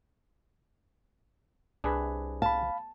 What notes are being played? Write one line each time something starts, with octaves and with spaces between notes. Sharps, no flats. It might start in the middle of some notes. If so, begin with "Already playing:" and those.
C2 D4 G#4 B4
F5 A5 B5